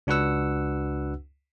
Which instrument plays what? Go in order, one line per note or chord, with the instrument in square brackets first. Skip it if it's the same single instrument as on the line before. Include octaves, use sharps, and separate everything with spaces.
[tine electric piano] C#2 D4 F#4 B4 F#5 E6